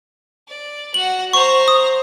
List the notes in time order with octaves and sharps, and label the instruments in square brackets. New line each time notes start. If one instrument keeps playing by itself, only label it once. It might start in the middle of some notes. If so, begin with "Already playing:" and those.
[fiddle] D5
[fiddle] F#4 F#5 [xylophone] F#7
[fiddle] C5 A#5 [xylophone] C#6
[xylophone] D#6